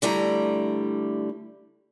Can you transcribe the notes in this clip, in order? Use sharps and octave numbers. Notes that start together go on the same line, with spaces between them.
D3 G3 A3 E4 A#5